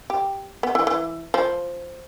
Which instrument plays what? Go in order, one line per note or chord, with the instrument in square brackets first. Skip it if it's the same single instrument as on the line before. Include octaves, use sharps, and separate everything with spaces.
[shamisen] G4
B3
E3
E3
F3